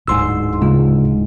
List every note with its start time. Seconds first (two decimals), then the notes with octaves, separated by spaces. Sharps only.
0.08 D1 D2 G#2 C6 E6
0.61 C#3 G#3 F4